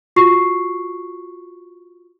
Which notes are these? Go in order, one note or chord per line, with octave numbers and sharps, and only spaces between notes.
F4 F#4 C#6 C7